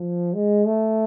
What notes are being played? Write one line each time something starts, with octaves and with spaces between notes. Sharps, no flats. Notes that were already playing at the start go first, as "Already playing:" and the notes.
Already playing: F3
G#3
A3